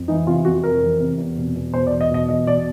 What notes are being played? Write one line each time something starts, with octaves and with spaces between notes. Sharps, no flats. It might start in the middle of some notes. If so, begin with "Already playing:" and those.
Already playing: F2
E3 D#4
C3 F4
F2 F#4
F2 A#4
E3
C3
E2
B2
E2
B2 C5
D5
E2
D#5
B2 D#5
E2 D#5
B2 D5